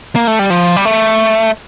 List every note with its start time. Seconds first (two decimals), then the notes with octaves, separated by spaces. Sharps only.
0.16 A#3
0.27 A3
0.39 G3
0.50 F3
0.76 G3
0.85 A3